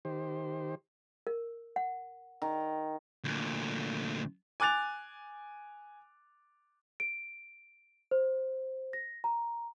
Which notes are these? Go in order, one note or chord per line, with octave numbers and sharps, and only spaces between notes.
D#3 G4 C5
A#4
F#5
D#3
D2 A#2
G#5 D6 F#6 A6 F7
D7
C5
A#6
A#5